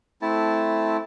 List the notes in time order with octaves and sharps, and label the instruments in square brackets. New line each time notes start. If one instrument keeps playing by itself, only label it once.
[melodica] A3 C4 E4 A5